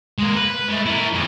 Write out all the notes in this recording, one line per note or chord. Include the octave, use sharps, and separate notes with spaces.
G#3 A#3
A#4 B4
G#3 A3
E4 A#4
F2 G#3